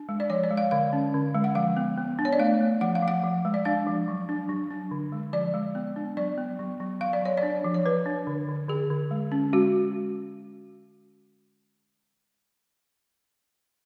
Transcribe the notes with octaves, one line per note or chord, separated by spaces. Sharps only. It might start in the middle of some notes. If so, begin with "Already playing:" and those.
Already playing: D4
G#3
D5
F3 C#5
D5
G#3
F5
D3 F5
C#4
D3
G#3
F#5
F3 F5
B3
B3
D4
C#5
D5
A3 F5
A3
F3 F#5
F5
F3
F#5
F3
G#3
D5
D4 F5
F3
F#3
D4
F#3
D4
D3
G#3
F3 D5
G#3
B3
D4
F#3 D5
B3
F#3
F#3
F#3 F5
D5
F#3 C#5
D5
D4
F3
C#5
F3 B4
D4
D3
D3
D3 G#4
D3
G#3
C#4
G#3 F#4